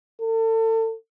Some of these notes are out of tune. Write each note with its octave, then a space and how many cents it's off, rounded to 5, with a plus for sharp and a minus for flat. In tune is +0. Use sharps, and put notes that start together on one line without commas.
A4 +35